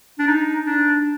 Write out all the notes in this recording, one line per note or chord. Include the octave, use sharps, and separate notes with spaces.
D4
D#4
D4